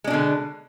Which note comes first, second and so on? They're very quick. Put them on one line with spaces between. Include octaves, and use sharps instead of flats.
G#3 D4 B2 D3